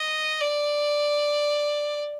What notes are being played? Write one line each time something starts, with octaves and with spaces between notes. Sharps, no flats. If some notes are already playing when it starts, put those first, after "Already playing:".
Already playing: D#5
D5